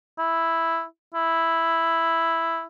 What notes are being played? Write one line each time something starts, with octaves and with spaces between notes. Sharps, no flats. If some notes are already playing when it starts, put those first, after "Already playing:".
E4
E4